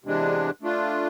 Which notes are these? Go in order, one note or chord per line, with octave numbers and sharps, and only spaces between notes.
E2 C3 G#3 D4
A3 D4 F4